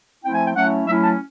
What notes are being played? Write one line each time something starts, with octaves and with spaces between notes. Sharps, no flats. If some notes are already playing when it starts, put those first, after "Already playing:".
F3 A3 C4 E4 G5
G#5
G5
F#3 A3 C#4 E4 F#5
F#3 A3 C#4 E4 E5
A5